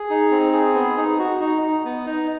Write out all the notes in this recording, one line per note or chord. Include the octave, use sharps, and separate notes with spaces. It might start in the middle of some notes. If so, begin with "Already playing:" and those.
Already playing: G#4
D#4
C4
G#4
B3
D#4
F#4
D#4
D#4
B3
D#4